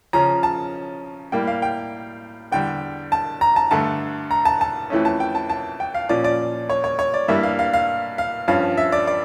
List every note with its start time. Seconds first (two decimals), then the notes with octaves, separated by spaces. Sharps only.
0.13 C#3 F3 C#4 A#5
0.43 A5
1.32 A2 G3 A#3 G5
1.47 F5
1.62 G5
2.52 E2 D3 G3 G5
3.12 A5
3.41 A#5
3.56 A5
3.71 G2 D3 A3 A5
4.31 A#5
4.45 A5
4.61 A5
4.90 F2 E3 A3 C#4
5.05 A5
5.20 G5
5.35 A5
5.50 A5
5.80 G5
5.94 F5
6.09 A#2 F3 C#4 D5
6.24 D5
6.70 C#5
6.84 C#5
6.99 C#5
7.14 D5
7.28 G2 E3 G3 A#3 E5
7.43 F5
7.59 F5
7.73 F5
8.18 F5
8.48 G2 F3 C#4 F5
8.77 E5
8.92 D5
9.07 D5